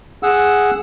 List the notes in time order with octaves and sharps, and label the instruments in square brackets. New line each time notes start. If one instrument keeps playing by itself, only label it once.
[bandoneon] G#4 F#5 E6